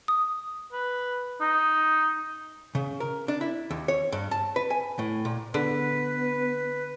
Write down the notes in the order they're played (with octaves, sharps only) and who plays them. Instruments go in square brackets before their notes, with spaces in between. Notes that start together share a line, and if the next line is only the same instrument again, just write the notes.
[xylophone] D#6
[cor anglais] B4
[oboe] D#4
[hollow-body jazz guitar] C#3
A#4
D4
E4
D#2
C#5
G2
A5
B4
G#5
A2
A#2
[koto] D3 [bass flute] B3 [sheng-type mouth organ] B4